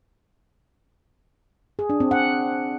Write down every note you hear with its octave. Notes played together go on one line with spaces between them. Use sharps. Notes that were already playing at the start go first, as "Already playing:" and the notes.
G#4
D4
C4
F#5